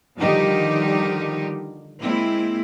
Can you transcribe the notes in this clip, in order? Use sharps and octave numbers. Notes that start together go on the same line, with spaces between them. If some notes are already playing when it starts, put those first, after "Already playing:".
D3 D#3 F3 G3 D#4 G4
G#3 A#3 C4 E4